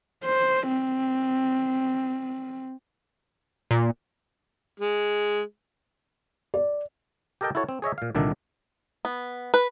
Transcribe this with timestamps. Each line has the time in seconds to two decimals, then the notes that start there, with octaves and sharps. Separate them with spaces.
0.24 C5
0.68 C4
3.71 A#2
4.80 G#3
6.54 D5
7.41 G4 A4 A#4 D#5 G5 A5
7.55 E4 F#4 A4 C#5
7.69 C4
7.82 G#4 C#5 D#5 E5
7.98 A#2 F5
8.15 C2 A#2 D3 D#3 D4 E5
9.05 B3
9.54 B4